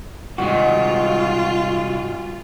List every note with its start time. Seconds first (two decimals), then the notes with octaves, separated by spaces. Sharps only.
0.38 C2 G2 A#2 D#3 G#3 F4 F#4